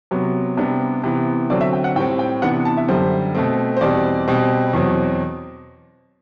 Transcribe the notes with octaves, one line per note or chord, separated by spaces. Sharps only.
C3 F#3 B3
C3 G3 B3 D4
C3 E3 B3
D3 F#3 C4 D5
E5
G5
F#5
A2 G3 C4 G5
G5
C3 E3 B3 D4 F#5
A5
E5
F#2 D3 G3 C5
B2 A3 C4
C5
E2 B2 G3 C4 D5
B2 G3 C4
E2 B2 F#3 C4